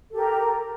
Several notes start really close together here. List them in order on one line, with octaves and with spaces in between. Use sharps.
A4 G4 A#4 A#5